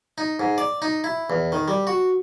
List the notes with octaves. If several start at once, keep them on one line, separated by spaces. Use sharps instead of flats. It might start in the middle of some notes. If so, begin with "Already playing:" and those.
D#4
G#2
D5
D#4
E4
E2
D#3
G3
F#4